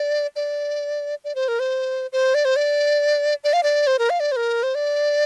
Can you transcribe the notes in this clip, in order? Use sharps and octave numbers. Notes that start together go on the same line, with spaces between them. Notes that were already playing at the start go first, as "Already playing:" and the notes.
Already playing: D5
D5
D5
C5
A#4
C5
C5
D5
C5
D5
D5
F5
D5
C5
A#4
F5
D5
C5
A#4
C5
D5